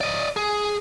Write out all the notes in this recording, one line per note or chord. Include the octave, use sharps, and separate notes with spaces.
D5 D#5
G#4